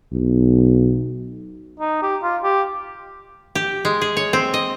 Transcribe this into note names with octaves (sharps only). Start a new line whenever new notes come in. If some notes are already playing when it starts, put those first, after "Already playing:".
B1
D#4
G4
F4
G4
G4
G#3
G#4
C#5
C4
D#5